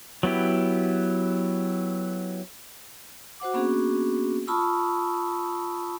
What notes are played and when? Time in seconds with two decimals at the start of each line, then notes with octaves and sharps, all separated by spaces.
0.23 F#3 B3 E4 G4
3.40 F#4 C5 F#5 D6
3.54 A#3 B3 C#4 D4 F#4 G#4
4.47 F4 A5 B5 C#6 D#6 E6